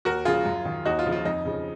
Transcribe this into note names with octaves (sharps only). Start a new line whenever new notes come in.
D#2 F#4 A#4
C#3 F3 F4 G#4
F#2
D#3
D#2 D#4 F#4
F4
C#3 F3
F4
F2 D#4
C#3 F3